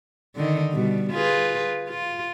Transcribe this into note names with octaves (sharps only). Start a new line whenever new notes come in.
D3 D#3 D#4
B2 G3
F4 G#4 B4
F4